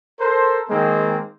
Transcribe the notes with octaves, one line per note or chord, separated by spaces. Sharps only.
A4 A#4 C5
D#3 G#3 A#3 C4